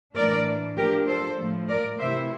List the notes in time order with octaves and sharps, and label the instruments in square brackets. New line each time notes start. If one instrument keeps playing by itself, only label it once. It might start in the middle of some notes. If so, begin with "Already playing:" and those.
[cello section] A2 E3 A3 D4 A#4 D5
F3 A3 D4 G4 A#4
A4 C5
A2 F3 A3
A#4 D5
C3 E3 A3 E4 C5 E5